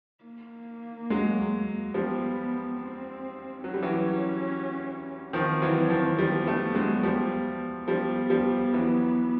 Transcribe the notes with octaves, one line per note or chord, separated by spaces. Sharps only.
A#3
F#3 G#3
F3 G3 B3
C4
F#3 C#4
G3
E3 F#3
D#3 F3 C4
E3 F#3
D#3 F3
F3 G3 B3
G3 A3
F#3 G#3
F3 G3
F3 G3 B3
F3 G3
E3 F#3